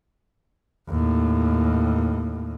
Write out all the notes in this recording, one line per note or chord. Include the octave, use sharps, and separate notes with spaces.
D#2 A2